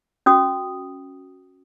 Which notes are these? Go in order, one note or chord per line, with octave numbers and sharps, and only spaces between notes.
C#4 F#4 D#6